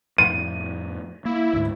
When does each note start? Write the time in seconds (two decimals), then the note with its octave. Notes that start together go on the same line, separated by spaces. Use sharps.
0.18 F2 A2 D#7
1.25 A#3 E4
1.53 D2 G#2